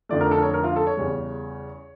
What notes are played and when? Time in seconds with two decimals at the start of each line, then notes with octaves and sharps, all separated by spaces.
0.09 F2 D3 F3 A3 D5
0.21 A#4
0.31 A4
0.37 A#4
0.43 C#5
0.54 A#4
0.64 F4
0.76 A4
0.87 C#5
0.97 E2 C#3 G3